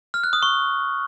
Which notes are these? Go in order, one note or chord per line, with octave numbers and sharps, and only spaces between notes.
F6
F#6
D#6
C#6